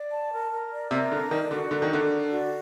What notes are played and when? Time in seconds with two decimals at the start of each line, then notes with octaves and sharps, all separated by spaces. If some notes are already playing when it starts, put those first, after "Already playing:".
Already playing: D5
0.11 A5
0.31 A#4
0.51 A#4
0.71 D5
0.91 C3 A#4
1.11 D3 D4
1.31 D#3 D5
1.51 D3 F#4
1.71 D3 A#4
1.82 D#3
1.91 D3 D4
2.11 D5
2.31 F#4